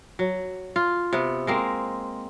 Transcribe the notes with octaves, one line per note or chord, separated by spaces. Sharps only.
F#3
F4
C3 B3
G#3 A#3 C4